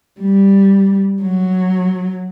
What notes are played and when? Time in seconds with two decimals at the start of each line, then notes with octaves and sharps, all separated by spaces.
0.21 G3
1.23 F#3